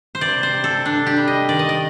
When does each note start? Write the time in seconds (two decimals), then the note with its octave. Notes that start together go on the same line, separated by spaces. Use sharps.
0.15 C5
0.21 C3 D5
0.43 C5
0.54 C3
0.64 A4
0.85 C3 D4
1.06 G4
1.17 G3
1.28 D#5
1.49 D#3 D5
1.59 D#5
1.69 D5